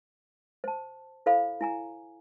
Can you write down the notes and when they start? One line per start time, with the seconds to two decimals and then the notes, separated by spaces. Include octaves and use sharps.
0.64 C5 A5
1.26 E4 A4 C5 F5 B5
1.61 E4 G#5 A#5